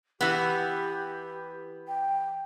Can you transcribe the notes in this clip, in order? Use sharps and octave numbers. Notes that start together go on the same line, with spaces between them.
E3 B3 G4
G5